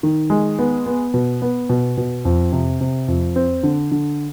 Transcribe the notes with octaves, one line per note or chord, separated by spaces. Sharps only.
D#3
G#3
B3
B3
B2
B3
B2
B2
F2
C3
C3
F2
C4
D3
D3